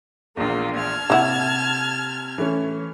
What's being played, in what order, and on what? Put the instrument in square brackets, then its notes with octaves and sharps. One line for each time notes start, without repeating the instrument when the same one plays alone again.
[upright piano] A#1 E2 [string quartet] A#3 F4
[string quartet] A5 F6 G#6
[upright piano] C3 [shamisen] A#3 E4 F#5
[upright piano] E3 A3 C#4